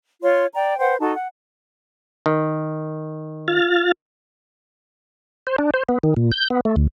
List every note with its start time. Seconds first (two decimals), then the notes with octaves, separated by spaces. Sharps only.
0.22 F4 C#5 C6
0.54 D5 G5 A#5
0.79 B4 C5 F#5 G5
1.00 D#4 F#4 A4 A5
1.15 F#5
2.26 D#3
3.48 F4 F6 A6
5.47 C5
5.58 D4
5.74 C5
5.89 B3
6.03 D#3
6.17 A#2
6.32 G6
6.50 B3
6.65 A3
6.76 D2